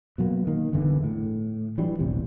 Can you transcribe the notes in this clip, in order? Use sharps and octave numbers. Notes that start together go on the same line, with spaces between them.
B2 F#3 A3 A#3
D#3 A#3
G1 E2 D3 E3
A2
E3 F#3 G3 D4
D#1 A1 C3